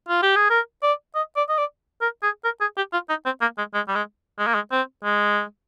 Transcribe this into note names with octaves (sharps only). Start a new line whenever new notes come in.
F4
G4
G#4
A#4
D5
D#5
D5
D#5
D5
A#4
G#4
A#4
G#4
G4
F4
D#4
C4
A#3
G#3
G#3
G3
G#3
G#3
A#3
G#3
C4
G#3